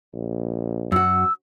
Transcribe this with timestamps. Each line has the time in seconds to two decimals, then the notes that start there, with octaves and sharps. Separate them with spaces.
0.14 A#1
0.92 F#2 F#4 E6